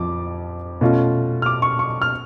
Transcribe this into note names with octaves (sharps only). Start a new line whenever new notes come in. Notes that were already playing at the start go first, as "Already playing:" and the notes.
Already playing: F2 F3 D6
B2 A3 C#4 F4
F6
D6
C#6
C#6
F6